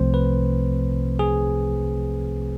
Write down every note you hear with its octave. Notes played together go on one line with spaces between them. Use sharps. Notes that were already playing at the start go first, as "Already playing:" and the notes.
Already playing: C2 C3 F3 A3 C4 C5
B4
G#4